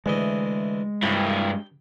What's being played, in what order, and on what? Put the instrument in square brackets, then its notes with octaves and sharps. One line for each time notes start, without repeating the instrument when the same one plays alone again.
[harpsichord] D2 E3 D#5 [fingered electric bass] G#3
[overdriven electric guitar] G2 E4 [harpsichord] G5